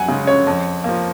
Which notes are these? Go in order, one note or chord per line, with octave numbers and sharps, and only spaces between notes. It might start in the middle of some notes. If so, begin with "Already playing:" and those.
Already playing: F#2 F#5 G#5
C#3 G#3
C#5
F2
F3 A#3